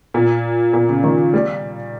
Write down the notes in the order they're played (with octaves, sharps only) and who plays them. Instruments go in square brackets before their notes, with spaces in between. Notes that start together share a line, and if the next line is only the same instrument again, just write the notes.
[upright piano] A#2
A#2
C#3
D#3
G3